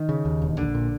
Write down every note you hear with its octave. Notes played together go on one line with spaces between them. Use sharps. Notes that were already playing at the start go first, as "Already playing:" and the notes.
Already playing: D#3
C#3
D#2
E1
A#1 D3
A#2